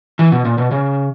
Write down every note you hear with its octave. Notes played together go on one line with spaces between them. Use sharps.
E3
B2
A#2
B2
C#3